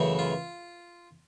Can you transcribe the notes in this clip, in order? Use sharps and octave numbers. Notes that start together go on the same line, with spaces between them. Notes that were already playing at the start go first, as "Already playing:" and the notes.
Already playing: F#2 C#3 E3 A3
F4